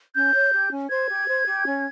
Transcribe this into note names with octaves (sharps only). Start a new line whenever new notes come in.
C#4 G6
C#5
G4
C#4
C5 G#6
G4
C5
G4
C#4